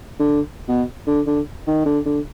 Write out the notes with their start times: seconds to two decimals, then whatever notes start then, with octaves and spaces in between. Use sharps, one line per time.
0.19 D3
0.68 B2
1.07 D3
1.27 D3
1.67 D#3
1.85 D3
2.06 D3